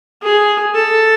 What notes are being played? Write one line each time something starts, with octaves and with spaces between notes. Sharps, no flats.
G#4
A4